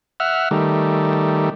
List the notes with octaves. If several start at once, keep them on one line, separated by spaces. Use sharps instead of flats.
E5 F#5 F6
D#3 G3 A3